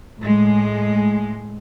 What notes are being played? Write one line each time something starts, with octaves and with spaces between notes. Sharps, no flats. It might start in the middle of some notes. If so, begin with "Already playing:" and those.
A2 G#3